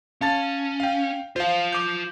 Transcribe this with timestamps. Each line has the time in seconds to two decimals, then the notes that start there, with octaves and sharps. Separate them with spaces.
0.21 C#4 F5 A5 A6
0.80 F5 G5
1.36 F4 C5 F5 A5
1.72 D6 G6